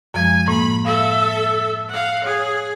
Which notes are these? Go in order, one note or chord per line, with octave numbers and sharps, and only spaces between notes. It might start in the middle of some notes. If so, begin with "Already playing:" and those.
F#2 F3 G#3 G#5
A2 A#3 B5
A4 E5 F5
F5 F#5
G#4 C#5